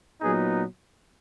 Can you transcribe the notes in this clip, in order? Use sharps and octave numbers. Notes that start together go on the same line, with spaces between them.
A#2 F#3 B3 D#4 G#4